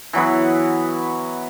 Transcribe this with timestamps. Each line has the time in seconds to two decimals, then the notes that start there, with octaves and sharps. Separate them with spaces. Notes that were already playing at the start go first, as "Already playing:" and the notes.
0.13 E3 F#3 B3 B4